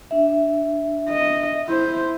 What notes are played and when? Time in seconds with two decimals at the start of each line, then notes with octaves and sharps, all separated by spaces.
0.11 D4 E5
1.09 D#5
1.68 E4 C5